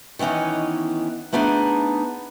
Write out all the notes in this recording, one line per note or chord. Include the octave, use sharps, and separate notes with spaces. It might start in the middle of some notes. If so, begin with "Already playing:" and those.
D#3 E3 B3 C#4 D#4
A3 B3 D4 D#4 G#4